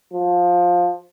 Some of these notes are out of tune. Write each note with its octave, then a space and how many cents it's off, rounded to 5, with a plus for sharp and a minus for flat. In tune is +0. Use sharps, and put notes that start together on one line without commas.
F3 +15